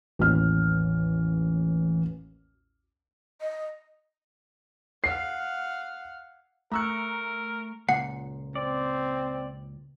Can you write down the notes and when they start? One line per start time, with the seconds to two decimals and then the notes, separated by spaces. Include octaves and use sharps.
0.19 A1 D#2 E3 F6
3.41 D#5
5.04 F5 F#5 C7
6.72 A3 A#4 A#5 C#6 E6 F#6 C#7
7.89 C#2 A#2 F#5 C7
8.55 C4 D5